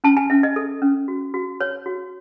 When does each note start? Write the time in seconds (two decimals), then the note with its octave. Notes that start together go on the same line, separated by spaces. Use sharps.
0.04 C#4 A5
0.17 G#5
0.30 C#4 E5
0.43 D#5
0.56 A4
0.82 C#4
1.08 F#4
1.34 F#4
1.61 C#5
1.86 F#4